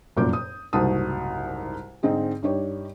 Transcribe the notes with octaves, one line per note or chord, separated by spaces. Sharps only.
F1 F#2 A#2 D6 G6
D#6
F#1 C2 G#2 F#4 A5 D#6
G#2 D3 C4 D#4 G#4
G2 D#4 G4 C#5